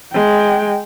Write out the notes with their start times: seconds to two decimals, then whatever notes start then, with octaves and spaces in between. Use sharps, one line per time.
0.13 G#3 G5